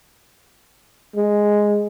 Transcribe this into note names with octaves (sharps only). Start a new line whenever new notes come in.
G#3